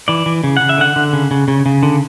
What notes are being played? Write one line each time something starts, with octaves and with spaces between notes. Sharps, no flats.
E3 D5
E3
C#3
C#3 F#5
E5
D3 F#5
D3
C#3
C#3
C#3
C#3
D3